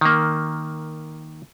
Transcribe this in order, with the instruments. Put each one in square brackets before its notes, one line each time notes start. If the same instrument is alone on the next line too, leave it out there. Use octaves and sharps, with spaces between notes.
[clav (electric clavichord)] D#3 A#3